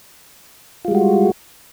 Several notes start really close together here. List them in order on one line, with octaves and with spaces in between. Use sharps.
F4 G#3 G3 F#4